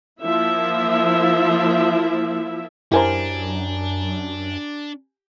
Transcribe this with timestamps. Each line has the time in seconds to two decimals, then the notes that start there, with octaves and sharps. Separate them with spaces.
0.23 F3 A#3 E4 E5
2.92 F#2 D4 E4 G4 A#4 C5 G#5 A#5